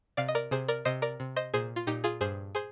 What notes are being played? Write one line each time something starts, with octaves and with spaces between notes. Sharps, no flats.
C3 D5 F5
D#5
A#4 D5
C3 G#4 C5
A#4 D5
C3 C5 D#5
A#4 D5
C3
C5 D#5
A#2 G#4 C5
F4
A#2 D#4 G4
F4 G#4
G2 G#4 C5
G#4 C5